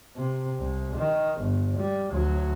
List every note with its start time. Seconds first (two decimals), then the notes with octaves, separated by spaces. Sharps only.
0.17 C3
0.59 C2
0.96 D#3
1.40 G1
1.77 G3
2.10 D2 F#3